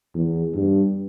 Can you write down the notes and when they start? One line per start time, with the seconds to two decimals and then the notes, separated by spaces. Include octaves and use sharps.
0.15 E2
0.54 G2